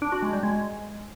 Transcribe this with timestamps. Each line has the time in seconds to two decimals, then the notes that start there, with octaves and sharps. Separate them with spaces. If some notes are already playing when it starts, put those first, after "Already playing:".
0.02 D4
0.12 F#4
0.23 G#3
0.33 G3
0.43 G#3